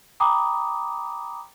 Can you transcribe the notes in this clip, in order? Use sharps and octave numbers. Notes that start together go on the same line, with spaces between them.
G5 A#5 B5 D6 D#6